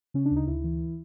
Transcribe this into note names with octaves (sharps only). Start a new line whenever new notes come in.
C#3 C#4
D4
D2 D#4
D2 E4
E3